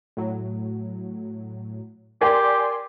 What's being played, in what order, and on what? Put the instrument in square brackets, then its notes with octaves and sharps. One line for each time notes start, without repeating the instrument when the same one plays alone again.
[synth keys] A2 F#3
[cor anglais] G4 [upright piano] A#4 G5 [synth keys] D5 G#5 C6